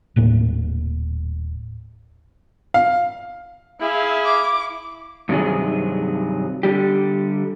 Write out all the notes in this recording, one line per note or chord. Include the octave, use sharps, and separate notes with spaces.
D#1 A2 A#3
F5
E4 G#4 E5 F5
D6
G2 C3 D#3 F#3 G#4
D3 G3 G4